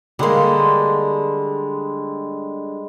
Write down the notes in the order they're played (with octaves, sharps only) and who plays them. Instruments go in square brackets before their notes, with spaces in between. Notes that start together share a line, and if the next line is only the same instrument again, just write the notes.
[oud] D3 A#3 [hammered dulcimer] G3 G#3 C6